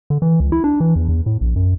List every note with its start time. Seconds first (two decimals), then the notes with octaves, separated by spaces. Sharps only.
0.10 D3
0.22 E3
0.40 C#2
0.52 E4
0.64 D4
0.80 E3
0.96 E2
1.09 E2
1.26 A2
1.41 A#1
1.56 F#2